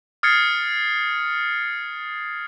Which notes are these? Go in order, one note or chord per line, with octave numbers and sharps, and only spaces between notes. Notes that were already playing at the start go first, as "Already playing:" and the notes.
D#6 F6 G#6 A6 C7 C#7